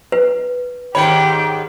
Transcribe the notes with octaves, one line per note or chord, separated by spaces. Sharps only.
B4
G#2 D#3 G4 C#5 G5 B5